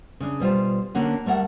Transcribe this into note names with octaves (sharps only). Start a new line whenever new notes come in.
C#3 D4
B2 G3 F4 C5
D3 A#3 C#4 F#4
G3 A3 A#4 F#5